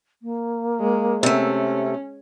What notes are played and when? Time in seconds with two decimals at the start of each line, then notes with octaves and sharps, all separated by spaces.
0.22 A#3
0.80 G#3
1.23 C3 A3 C#4